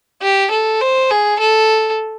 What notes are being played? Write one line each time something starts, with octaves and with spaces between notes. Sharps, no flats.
G4
A4
C5
G#4
A4